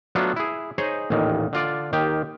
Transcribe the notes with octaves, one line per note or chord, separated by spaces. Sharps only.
F#3 A3 B3 D4 F4 A4
E4 G#4
D#4 G#4 C5 C#5 D#5 G#5
A1 D#2 A#2 D#3
D3 F4 D5
D#2 D#3 G4